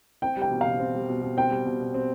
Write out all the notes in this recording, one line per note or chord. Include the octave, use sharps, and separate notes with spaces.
C4 G5
G3
G5
B2
B2 F5
C4
G3
B2
B2
C4 G5
G3
B2
B2
C4